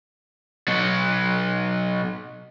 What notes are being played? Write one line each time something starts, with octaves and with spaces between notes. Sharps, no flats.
B2 F#3